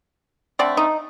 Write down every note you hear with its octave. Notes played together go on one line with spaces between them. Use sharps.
D3 A3 C4 D5
D#4